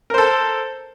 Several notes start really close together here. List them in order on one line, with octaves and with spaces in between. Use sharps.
A#4 C5 A4